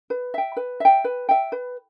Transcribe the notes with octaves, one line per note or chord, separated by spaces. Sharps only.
B4
E5 G5
B4
E5 G5
B4
E5 G5
B4